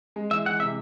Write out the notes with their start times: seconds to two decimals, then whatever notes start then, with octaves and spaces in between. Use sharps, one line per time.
0.16 G#3
0.31 E3 E5
0.46 E3 F#5
0.60 C3 E5